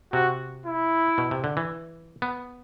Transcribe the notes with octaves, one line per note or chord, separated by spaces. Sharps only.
C3 F#4
E4
B2
C3
D3
E3
B3